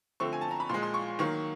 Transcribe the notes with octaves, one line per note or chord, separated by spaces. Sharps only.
D3 F3 A3 C4 C#6
G#5
A5
A#5
B5
A#2 F3 G#3 C6
C6
C#6
D#3 F#3 A#3 C#6